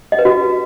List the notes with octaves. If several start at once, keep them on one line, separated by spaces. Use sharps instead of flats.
D#5
B4
F#4